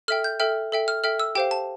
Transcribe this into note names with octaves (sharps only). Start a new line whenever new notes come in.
A4 E5 G5 F6
G6
A4 E5 G5 F6
A4 E5 G5
F6
A4 E5 G5 F6
E6
G4 C5 F5 G5
A5